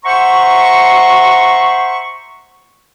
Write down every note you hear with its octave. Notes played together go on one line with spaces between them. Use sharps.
C5 E5 F#5 A#5 C6 C#6